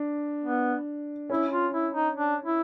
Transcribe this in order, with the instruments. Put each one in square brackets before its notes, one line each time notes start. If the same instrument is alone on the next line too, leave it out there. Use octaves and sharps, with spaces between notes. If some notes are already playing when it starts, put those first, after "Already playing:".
Already playing: [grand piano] D4
[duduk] B3
[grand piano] C#4 [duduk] E4
[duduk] F4
E4
D#4
D4
E4